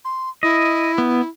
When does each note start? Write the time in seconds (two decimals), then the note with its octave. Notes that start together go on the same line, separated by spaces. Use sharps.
0.05 C6
0.43 E4 D#5
0.98 B3